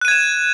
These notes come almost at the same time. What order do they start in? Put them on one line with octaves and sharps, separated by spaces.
F#6 D#7 G#6 E7